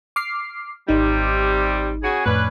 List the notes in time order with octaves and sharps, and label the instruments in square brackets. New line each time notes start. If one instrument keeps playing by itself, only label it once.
[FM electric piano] D6 F6 C7
[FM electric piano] G#1 D#4 [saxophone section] C3 G3
[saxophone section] C#3 F#4 G#4
[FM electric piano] F2 A2 [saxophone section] C#4 D4 B4